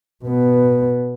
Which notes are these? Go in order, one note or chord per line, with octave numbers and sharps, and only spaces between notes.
B2 B3